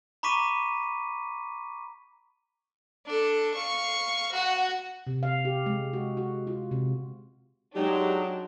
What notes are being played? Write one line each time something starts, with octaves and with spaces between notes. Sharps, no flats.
A#5 B5 C#6 D6 B6 D#7
D4 A4
F5 C#6
F#4 F#5
C3
F5
G4
G#3
F#4
F#4
F4
C3
F#3 G#3 D4 D#4 G4